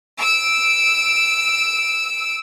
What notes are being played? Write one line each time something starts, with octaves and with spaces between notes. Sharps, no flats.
E6 D7